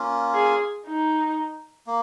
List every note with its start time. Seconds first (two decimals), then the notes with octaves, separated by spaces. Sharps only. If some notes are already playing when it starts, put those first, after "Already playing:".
Already playing: A#3 C#4 F4
0.34 G#4
0.86 D#4
1.87 A#3